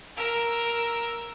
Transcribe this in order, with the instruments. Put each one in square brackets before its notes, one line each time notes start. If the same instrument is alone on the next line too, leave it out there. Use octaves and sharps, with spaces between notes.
[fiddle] A#4 E6